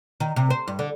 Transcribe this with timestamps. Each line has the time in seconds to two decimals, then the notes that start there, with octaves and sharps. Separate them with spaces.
0.20 D#3
0.36 C3
0.50 C5
0.68 G2
0.79 D3